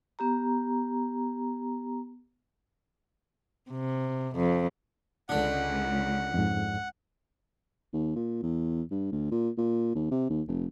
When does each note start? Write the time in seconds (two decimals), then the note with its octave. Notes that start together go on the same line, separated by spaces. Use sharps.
0.19 B3 G4 A#5
3.70 C3
4.36 F2
5.29 C#2 D3 D4 F#5
6.34 F2 G#2
7.93 D#2
8.16 A#2
8.43 E2
8.91 G2
9.12 D2
9.31 A#2
9.57 A#2
9.95 D#2
10.11 C3
10.30 D#2
10.48 F1